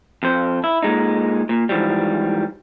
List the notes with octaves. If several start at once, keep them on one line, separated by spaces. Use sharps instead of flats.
F2 C5
E4
A#2 G#3 D#4
A#2
G#2 E3 F3 G3